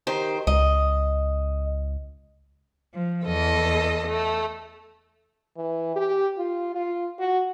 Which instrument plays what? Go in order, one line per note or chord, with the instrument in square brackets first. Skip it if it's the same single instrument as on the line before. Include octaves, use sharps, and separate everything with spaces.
[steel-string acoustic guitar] D#3 G4 C5
[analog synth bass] C#2 [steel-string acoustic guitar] D#5
[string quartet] F3
E2 A4 D#5
A3
[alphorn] E3
G4
F4
F4
F#4